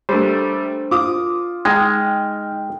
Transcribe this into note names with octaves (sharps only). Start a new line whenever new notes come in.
G3 A3 D4 A#4 C5
F4 D6 D#6
G#3 D#4 D#5 G5 F6